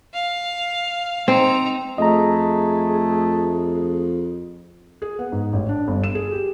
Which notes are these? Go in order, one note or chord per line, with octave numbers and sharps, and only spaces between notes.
F5
C4 D#4 A#5
F2 A3 G#4 D#5 A#5
G#4
B3
G#2
A1
D4
G1
E7
G#4
G4